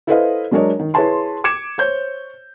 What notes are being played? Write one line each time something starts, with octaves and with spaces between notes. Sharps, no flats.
E4 A4 B4 C5 D#5 F5
F#3 G#3 D4 A#4 C#5 D#5
D#3
E4 G#4 B4 C#5 A5 C6
D6 G#6 C#7 E7
C5 C#5 G6